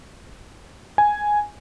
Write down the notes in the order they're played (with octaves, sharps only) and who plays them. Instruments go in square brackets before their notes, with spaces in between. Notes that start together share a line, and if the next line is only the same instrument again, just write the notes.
[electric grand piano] G#5